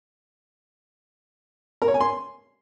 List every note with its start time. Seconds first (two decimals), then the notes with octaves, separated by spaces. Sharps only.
1.82 A#4
1.88 C#5
1.94 G#5
2.01 C6